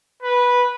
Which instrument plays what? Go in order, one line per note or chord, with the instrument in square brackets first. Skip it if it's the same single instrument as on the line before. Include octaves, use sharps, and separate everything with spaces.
[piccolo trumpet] B4